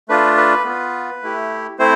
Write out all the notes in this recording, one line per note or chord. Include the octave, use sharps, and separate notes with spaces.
A3 D4 F4 B4
B4
B3 F4
A3 E4 G4
A3 C4 E4 C5